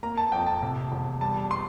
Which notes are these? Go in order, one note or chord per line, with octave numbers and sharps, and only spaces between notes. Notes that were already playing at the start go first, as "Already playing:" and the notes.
A#3 A#5
A5
F2 G5
A5
C3
E1
G3 A5
C6